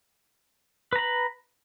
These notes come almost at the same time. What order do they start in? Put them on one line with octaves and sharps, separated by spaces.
B4 A#5 B5